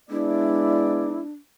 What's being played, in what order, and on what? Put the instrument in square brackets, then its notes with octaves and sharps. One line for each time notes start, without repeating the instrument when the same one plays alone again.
[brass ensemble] G#3 B3 D5 [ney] D4 [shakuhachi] E4